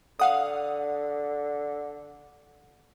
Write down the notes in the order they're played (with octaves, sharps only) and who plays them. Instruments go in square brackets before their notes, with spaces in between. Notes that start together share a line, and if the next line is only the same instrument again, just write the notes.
[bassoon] D3 [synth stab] F5 F#5 D#6